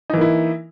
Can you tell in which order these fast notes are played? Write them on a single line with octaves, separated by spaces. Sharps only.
D#4 E3 A#3 E4